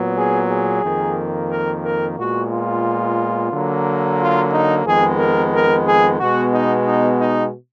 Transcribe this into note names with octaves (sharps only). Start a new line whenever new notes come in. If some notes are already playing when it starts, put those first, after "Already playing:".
Already playing: A#2 F#3 B3
G#4
G#4
F2 D#3 A#3
A#4
A#4
A#2 G#3 B3 F#4
F4
D3 F#3 A#3
F4
D#4
F2 D#3 G#3 B3 G#4
A#4
A#4
G#4
B2 G#3 B3 F#4
D#4
D#4
D#4